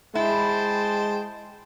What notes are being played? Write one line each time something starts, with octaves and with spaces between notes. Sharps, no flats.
G#3 E4 C5 G5 A5